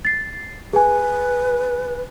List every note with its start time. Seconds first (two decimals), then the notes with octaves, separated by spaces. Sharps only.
0.05 A6 C7
0.73 G#4 B4 G#5